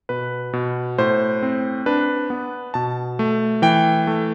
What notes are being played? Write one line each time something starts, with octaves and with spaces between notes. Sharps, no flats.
B2 B4
B2
A2 C5
C4
D4 B4
B3
B2 A5
A3
E3 G5
A3